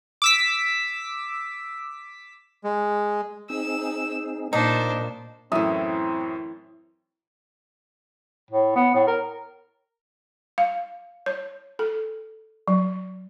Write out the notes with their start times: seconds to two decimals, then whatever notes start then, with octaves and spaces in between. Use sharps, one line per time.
0.22 D6 E6 B6
2.64 G#3
3.50 C4 D#4 G#4 E6
4.53 A#2 D4 D#4 C5
5.52 F#2 A2 E3 C4 E4 E5 D#6
8.51 A2
8.76 B3
8.94 A2
9.07 A#4
10.58 F5
11.26 C#5
11.79 A4
12.68 F#3